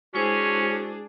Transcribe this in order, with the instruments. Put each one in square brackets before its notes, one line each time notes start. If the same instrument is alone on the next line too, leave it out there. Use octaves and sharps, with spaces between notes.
[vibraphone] G#3 E4 C5 [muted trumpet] C#4 [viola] D4 G#4 [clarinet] F#4